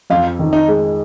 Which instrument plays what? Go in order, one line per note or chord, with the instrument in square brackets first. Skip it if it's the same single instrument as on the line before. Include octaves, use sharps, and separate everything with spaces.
[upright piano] F2 [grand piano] F4
[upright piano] D#3
[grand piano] D#4
[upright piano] G#3